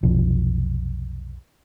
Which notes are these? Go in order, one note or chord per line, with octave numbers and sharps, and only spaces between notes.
F1 B1 F3